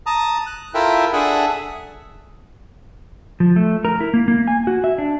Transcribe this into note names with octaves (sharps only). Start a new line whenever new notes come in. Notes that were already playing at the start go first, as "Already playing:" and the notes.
A5 A#5 D#6
F#6
E4 F4 A4 A#4 E5 G5
D4 G#4 A4 E5 F#5
F3
A3
A#4
E4
A#3
A#3
G#5
F#4
E5
D4